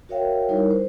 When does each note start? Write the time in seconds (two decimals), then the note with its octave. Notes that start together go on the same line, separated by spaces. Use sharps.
0.09 F#4 A#4 C#5 E5 F5 G5
0.49 G3 D#4 E4 A#4 C#5
0.71 C5